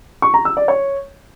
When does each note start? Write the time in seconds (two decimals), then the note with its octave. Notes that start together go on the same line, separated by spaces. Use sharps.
0.22 C#6
0.34 A#5
0.45 E6
0.57 D5
0.68 C#5